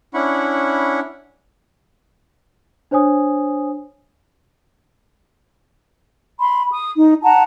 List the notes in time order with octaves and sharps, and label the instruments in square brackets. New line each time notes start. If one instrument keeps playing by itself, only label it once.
[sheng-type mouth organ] C#4 D4 E4 F#5 B5 C#6
[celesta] D4 C5 C#5 G#5 D#6
[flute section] B5 C6
D#6
D#4
F#5 A5 A#5